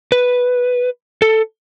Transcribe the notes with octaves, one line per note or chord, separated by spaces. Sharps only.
B4
A4